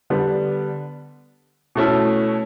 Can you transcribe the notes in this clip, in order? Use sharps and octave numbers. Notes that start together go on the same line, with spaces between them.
D3 G3 B3 D4
B2 A3 C#4 E4